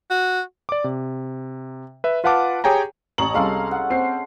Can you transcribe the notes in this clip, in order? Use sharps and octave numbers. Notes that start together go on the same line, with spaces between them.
F#4
D5 D6
C3
B4 E5
F4 B4 F5 F#5 A5 D6
G4 G#4 C#5 G5 G#5 A#5
A1 C#5 A5 A#5 F#7
C2 G#3 C#4 A4 F5 A#5
F#5
C4 C7